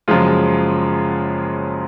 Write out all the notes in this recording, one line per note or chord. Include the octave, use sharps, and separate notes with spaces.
F#1 F#2 F3 G#3 F4